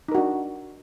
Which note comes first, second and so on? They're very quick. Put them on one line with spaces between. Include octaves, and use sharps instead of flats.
D#4 A#4 F#4 D4